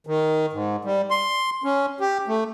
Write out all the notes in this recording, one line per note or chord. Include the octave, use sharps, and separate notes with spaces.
D#3
G#2
G3
C6
C#4
G4
A3